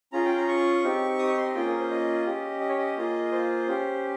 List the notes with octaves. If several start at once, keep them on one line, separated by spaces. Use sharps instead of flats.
C#4 F4 G#4 A#5
G5
A#5
C#6
C4 D#4 G4
D#6
C#6
C6
D#5
A#3 C#4 F4 G#4 G5
A#4
C5
D#5
C#4 G4
D#5
C#5
D#5
A#3 F4 G#4
C5
C#4 G4